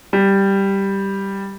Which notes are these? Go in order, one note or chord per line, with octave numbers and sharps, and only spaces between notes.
G3